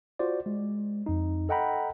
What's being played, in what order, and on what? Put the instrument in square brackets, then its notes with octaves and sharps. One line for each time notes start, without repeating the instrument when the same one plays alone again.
[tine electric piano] F4 F#4 C5 D5
G#3
F2 D#4
A4 D#5 F#5 G5 A#5 B5